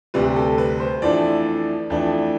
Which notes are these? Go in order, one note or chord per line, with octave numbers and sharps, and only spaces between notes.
D2 C3 G3 B4
A4
B4
C5
F2 E3 A3 D4 D5
F2 E3 A3 D4